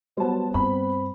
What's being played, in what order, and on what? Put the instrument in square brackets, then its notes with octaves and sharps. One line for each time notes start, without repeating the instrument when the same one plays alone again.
[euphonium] F#3 [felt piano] G3 B3 [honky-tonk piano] C5 A5
[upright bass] G2 [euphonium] C4 [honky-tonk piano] B5